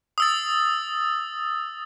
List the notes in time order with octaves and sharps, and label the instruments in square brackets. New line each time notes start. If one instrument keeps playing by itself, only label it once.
[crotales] D#6 E6 A6